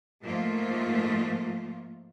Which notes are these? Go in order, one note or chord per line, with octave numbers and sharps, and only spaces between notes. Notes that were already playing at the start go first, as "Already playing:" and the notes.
G#2 F3 A3 A#3 F4